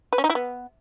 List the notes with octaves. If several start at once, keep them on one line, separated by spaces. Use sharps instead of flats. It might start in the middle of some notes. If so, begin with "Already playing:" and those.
B4
C#4
D#4
E4
B3